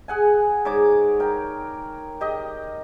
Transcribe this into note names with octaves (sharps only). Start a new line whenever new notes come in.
G#4 F#5 G#5
G#2 C#5 D6
A#4 G5
G4 D#5